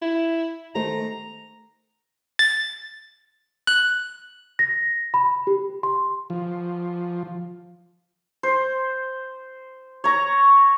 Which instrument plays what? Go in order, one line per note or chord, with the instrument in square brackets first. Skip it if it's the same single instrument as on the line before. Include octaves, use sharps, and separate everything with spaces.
[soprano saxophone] E4
[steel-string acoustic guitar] D#3 A3 C5 [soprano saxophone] A#5
[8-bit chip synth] A6
F#6
[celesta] A#6
B5
G4
C6
[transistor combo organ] F3
[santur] C5
C#5 A#5